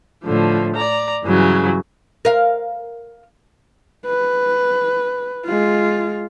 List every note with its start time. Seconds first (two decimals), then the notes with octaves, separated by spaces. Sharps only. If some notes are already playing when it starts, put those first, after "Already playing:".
0.24 A2 D3 F3
0.75 D5 A#5
1.23 G2 C#3 E3 F#3
2.25 A#4 F5
4.06 B4
5.45 G#3 F4